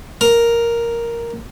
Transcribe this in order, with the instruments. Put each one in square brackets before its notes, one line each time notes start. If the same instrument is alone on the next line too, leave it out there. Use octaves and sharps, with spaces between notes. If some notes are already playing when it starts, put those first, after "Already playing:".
[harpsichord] A#4